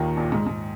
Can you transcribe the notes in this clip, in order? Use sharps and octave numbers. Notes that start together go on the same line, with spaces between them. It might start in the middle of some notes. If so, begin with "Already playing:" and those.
Already playing: D#2 A#2 D#3 A#3
A#1 A#2
G#2
G#2